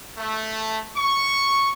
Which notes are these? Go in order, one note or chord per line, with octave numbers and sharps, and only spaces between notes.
A3
C#6